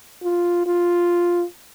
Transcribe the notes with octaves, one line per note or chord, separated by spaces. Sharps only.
F4
F4